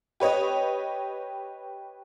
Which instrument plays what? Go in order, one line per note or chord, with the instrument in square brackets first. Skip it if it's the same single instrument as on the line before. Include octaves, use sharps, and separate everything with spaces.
[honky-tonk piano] G4 B4 C#5 D#5